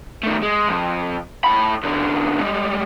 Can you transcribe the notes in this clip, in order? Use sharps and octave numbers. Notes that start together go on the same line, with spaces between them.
D#3 A3
G#3
F2
A2 B5
E2 D3
G3 G#3